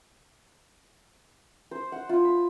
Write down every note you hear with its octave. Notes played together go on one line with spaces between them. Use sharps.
C5
F#5
F4
B5